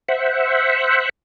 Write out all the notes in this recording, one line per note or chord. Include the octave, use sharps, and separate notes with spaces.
C5 E5 F#5